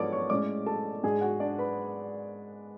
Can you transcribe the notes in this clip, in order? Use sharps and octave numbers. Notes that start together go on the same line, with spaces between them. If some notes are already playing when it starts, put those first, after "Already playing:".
Already playing: G#2 F3 B3 D4 A4 C#5 D5 D6
C#5 C#6
A2 G#3 C#4 D5 D6
A4 A5
G#2 G#3 D4 G#4 G#5
F#4 F#5
D4 D5
B4 B5